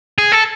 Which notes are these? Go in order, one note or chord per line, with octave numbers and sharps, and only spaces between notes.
G#4
A4